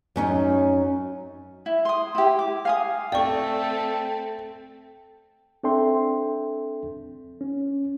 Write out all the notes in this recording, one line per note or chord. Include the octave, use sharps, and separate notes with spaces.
F#2 C#4 D#4
E4
C6 D#6
E4 G4
D6
F5 G#5 D#6
A3 C4 A4 D5 G5 C#6
C4 D4 A4 E5 G5 C6
C#4